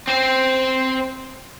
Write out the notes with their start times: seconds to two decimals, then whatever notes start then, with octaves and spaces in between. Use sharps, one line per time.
0.08 C4 C5